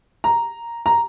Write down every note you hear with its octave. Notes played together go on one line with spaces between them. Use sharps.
A#5
A#5